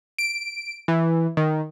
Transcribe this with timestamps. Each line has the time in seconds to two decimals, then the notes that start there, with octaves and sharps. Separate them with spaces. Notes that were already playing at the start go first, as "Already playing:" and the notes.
0.18 D7
0.88 E3
1.37 D#3